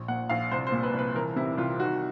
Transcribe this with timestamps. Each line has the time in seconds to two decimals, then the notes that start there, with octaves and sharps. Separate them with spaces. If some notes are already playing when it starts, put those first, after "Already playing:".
Already playing: A#1
0.08 A#2 F#5
0.29 A#1 F5
0.51 C2 C5
0.67 C5
0.72 A#2
0.83 B4
0.94 C2 B4
1.15 E3 A#4
1.36 C3 E4
1.57 C2 F4
1.79 D#3 F#4